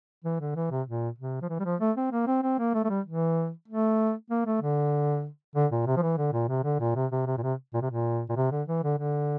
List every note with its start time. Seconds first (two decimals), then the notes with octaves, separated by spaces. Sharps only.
0.24 E3
0.40 D3
0.56 E3
0.71 C3
0.87 A#2
1.18 C3
1.42 F3
1.49 E3
1.59 G3
1.64 F3
1.81 A3
1.97 C4
2.12 A#3
2.27 C4
2.43 C4
2.59 A#3
2.74 A3
2.85 A3
2.90 G3
3.06 E3
3.68 A3
4.30 A#3
4.46 A3
4.62 D3
5.55 D3
5.72 A#2
5.87 C3
5.97 F3
6.02 E3
6.17 D3
6.33 A#2
6.48 C3
6.64 D3
6.80 A#2
6.95 C3
7.12 C3
7.26 C3
7.37 A#2
7.42 C3
7.74 A#2
7.82 C3
7.91 A#2
8.29 A#2
8.36 C3
8.51 D3
8.68 E3
8.84 D3
8.99 D3